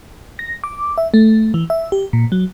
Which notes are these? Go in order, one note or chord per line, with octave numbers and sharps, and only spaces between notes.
A#6
D6
E5
A3
E3
E5
G4
A#2
F#3